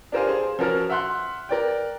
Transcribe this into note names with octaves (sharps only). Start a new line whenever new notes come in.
D4 G4 A#4 C5 F5 G#5
G#4 C5
F3 C#4 F#4 A#4 A5 F6
E5 F#5 C6 F#6
A#4 D5 G5